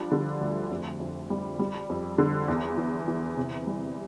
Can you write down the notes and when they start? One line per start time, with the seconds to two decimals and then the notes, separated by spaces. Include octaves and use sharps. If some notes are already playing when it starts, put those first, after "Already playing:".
Already playing: F3 G3 D4
0.12 D3
0.41 D2
0.71 F2
1.00 F2
1.30 G3
1.59 G3
1.90 F2
2.18 D3
2.48 E2
2.77 E3
3.08 E3
3.37 C3
3.67 G3